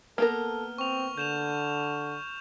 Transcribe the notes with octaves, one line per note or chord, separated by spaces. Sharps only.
A#3 B3 A4 A#4 F6
C4 C#6 F7
D3 G6 E7 F7